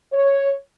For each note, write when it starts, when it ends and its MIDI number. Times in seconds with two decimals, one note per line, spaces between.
0.13 0.52 73